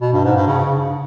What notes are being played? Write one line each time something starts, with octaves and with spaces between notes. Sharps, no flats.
B2
G2
G#2
G2
C#3